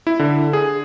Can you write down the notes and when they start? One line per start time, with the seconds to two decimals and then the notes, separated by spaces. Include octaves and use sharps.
0.07 E4
0.19 D3
0.53 G#4